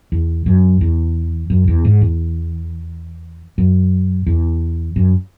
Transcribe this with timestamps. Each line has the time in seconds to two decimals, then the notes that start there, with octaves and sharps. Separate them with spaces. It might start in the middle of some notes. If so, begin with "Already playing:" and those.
0.12 E2
0.46 F#2
0.81 E2
1.50 F#2
1.68 E2
1.85 G#2
2.02 E2
3.58 F#2
4.26 E2
4.96 F#2